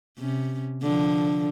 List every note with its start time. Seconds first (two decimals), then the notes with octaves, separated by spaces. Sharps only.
0.19 C3 C#4
0.82 D3 F3